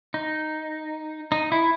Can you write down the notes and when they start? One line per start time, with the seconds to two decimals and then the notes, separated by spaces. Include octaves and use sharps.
0.14 D#4
1.32 D#4
1.52 E4